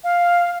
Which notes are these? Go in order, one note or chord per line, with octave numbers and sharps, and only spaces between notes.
F5